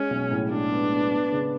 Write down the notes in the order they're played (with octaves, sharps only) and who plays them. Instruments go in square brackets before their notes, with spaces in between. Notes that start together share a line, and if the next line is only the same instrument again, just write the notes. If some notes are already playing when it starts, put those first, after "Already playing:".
Already playing: [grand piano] G#3 [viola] C#4
[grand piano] B1
A2
[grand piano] G#3 [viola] D4
[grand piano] B3
B3
B3
C#3